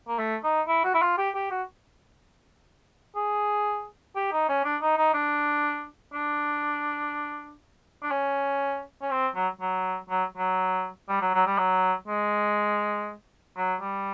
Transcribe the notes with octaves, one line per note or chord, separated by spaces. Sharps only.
A#3
A3
D#4
E4
F#4
E4
F4
G4
G4
F#4
G#4
G4
D#4
C#4
D4
D#4
D#4
D4
D4
D4
C#4
C#4
C4
F#3
F#3
F#3
F#3
G3
F#3
F#3
G3
F#3
G#3
F#3
G3